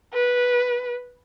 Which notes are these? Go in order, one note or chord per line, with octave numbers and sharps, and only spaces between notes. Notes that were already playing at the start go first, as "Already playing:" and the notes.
B4